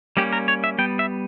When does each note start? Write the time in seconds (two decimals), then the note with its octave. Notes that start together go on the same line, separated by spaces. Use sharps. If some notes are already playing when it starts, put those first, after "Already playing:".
0.17 G3 A#3 C#4 G4
0.33 A#4
0.48 C#5
0.64 E5
0.78 G3 B3 G5
0.99 E5